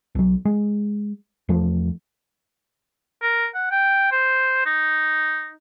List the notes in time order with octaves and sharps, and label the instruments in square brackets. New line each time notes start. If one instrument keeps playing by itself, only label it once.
[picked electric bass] B1 F#3
G#3
E2 F3 A3
[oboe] A#4
F#5
G5
C5
D#4